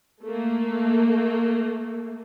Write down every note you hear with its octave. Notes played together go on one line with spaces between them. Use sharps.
A3 A#3